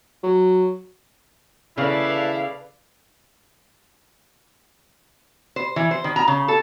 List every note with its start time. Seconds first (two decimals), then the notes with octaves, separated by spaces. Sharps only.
0.23 F#3
1.78 C#3 E4 A4 B4 D5 F5
5.56 C5
5.76 E3
5.91 C5
6.04 D#3
6.16 A#5
6.28 C#3
6.48 A4